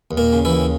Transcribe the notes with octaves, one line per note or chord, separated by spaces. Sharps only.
D#2
A#2 A#3
C#3
E3 E4
D#2